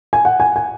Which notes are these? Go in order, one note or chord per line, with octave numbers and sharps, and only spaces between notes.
G#5
F#5
G#5
G#5